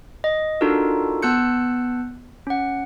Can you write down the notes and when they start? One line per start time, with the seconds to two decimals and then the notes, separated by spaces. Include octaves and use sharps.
0.24 D#5
0.61 D4 D#4 F4 F#4 A4 A#4
1.22 B3 A5 E6 F#6 G6 C#7
2.47 C#4 F#5